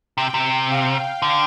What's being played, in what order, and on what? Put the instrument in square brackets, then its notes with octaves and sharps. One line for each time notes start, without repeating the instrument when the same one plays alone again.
[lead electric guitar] C3 [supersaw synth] G5
[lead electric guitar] C3
[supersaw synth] F5
[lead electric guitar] D3